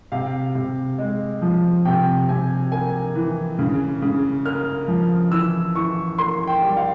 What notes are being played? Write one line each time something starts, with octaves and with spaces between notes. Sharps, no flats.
C3 F5
C3
G#3
F3
C3 G5
C3 G#5
A#3 G#5
E3
C#3
C#3
A#3 F6
F3
E3 E6
E3 C#6
A#3 C6
G5
G3
F5